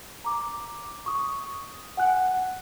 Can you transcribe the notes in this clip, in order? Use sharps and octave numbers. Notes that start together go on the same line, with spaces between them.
A#5 D6
C#6 D#6
F#5 G#5 F#6